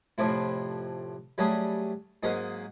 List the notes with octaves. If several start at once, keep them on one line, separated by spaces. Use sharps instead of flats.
F2 A2 C3 C4 E4
F#3 G3 A3 C#4 G#4
G#2 F#3 A#3 C#4 D#4